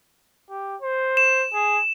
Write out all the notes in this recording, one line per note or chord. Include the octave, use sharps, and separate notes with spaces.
G4
C5
E7
G#4